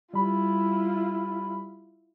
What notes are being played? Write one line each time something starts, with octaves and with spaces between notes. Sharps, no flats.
G3 E4 F4 B5